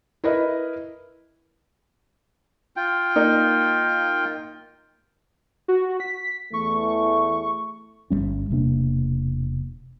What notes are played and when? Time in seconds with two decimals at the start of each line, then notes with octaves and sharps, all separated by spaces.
0.24 E4 A#4 B4 D#5
2.76 F4 G5
3.16 A#3 D#4
5.68 F#4
6.00 B6
6.53 E2 E3 A3 C#6
8.10 G1 G2 G3 C#4
8.50 E1 C3 A#3 D4